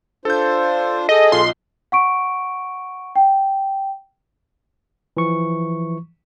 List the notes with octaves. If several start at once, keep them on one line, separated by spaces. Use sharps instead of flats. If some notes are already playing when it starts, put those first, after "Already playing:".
D4 F4 A4 C5 G6
G#4 A4 D#5
B1 F4 D#5 C6
F#5 C#6 D7
G5
E3 F3 C#6